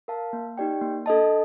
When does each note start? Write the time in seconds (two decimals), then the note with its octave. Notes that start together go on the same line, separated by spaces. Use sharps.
0.08 A#4 F5 A5
0.33 A#3
0.58 D#4 G4 D5 G5
0.82 A#3
1.06 D4 A4 D#5 A5